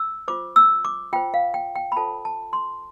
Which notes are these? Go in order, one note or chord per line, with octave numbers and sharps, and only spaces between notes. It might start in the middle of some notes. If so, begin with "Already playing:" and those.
Already playing: E6
F4 C5 D6
E6
D6
F4 C5 G5
F5
G5
G5
B5
F4 A4 C5 A5
A5
C6